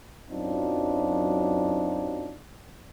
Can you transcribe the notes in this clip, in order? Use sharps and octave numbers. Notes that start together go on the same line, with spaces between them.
F#2 F#3 C4 D4 D#4 F4